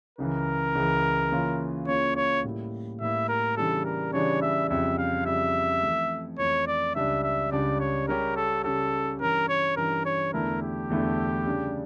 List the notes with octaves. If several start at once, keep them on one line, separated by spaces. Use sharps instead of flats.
C#2 C#3 E3 A#4
C#2 C#3 E3
C#3 E3 A#3 C#4 F4
C#3 E3 A#3 C#4 F4 C#5
C#5
A2 G3 A#3 E4
A2 G3 A#3 E4 E5
A#4
C#3 E3 G3 D4 A4
A#4
C#3 E3 G3 D4 C#5
E5
F2 C#3 G3 E5
F5
F2 C#3 G3 E5
F2 E3 A3
F2 E3 A3 C#5
D5
C#2 C#3 G3 D4 E5
E5
C#2 C#3 G3 D4 D5
C#5
C#3 G3 C#4 G4 A#4
A4
C#3 G3 C#4 G4 A4
G2 E3 G3 C#4 A#4
C#5
G2 E3 G3 C#4 A#4
C#5
E2 D3 A3 E4 A#4
G4
E2 D3 A3 E4
C#3 G3 D4